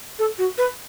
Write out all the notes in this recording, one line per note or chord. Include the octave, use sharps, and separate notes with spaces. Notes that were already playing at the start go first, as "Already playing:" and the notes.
A4
F#4
B4